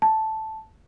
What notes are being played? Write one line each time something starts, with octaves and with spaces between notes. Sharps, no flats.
A5